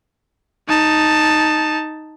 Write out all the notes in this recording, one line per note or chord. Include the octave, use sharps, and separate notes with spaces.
D#4 A5